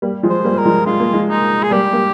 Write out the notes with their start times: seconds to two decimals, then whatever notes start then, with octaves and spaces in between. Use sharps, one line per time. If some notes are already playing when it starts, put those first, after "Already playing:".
0.02 G3 A#3
0.23 F3 G#3
0.30 C5
0.44 G3 A#3
0.59 A#4
0.65 F3 G#3
0.86 G#3 F4
1.00 A#3
1.14 F3 G#3
1.30 D#4
1.63 G#4
1.71 G3 A#3 G4
1.93 G3 A#3